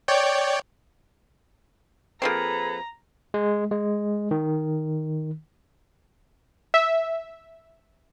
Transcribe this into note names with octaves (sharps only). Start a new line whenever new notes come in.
C#5 D5 G5
F3 A#3 C4 G#4 A4 B4 A#5
G#3
G#3
D#3
E5